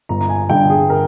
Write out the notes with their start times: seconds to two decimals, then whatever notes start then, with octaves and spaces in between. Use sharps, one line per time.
0.09 G1 A#5
0.21 A#5
0.29 G#5
0.50 G2 D3 G5
0.70 G#4
0.90 A#4